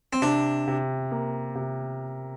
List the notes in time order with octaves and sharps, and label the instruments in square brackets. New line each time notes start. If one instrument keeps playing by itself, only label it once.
[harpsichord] C4
[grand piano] C3 [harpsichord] D4
[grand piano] C3
A#3
C3